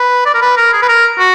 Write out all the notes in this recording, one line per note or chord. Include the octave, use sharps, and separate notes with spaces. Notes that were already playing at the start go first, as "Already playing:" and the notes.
Already playing: B4
D5
A#4
B4
A#4
G#4
B4
A#4
F#4